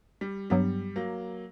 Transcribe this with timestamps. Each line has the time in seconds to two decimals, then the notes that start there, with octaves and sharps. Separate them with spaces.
0.21 G3
0.50 G2 F#3 G3 B3
0.96 F#3 A#3